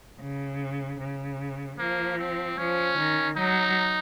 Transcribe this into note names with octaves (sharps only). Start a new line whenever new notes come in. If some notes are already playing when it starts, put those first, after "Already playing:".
C#3
C#3
F3 A#3
C4
F3 C#4
D#3
F#3 D#4